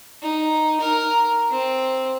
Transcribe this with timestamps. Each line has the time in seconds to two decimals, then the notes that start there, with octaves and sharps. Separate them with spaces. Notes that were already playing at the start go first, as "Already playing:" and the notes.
0.22 D#4
0.81 A#4
1.51 C4